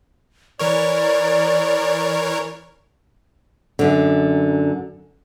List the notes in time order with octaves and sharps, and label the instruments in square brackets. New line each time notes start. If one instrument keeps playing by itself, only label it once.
[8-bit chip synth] E3 A#4 C#5 [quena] D5
[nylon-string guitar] F#2 D3